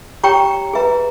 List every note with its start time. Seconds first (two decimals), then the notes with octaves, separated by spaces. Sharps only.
0.24 G4 C#5 G5 A#5 C#6
0.73 G#4 B4 E5 A#5